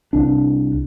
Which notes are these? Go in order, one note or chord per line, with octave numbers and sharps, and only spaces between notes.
C2 D4